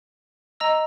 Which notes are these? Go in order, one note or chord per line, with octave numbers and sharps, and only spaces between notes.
D#5 A#5 E6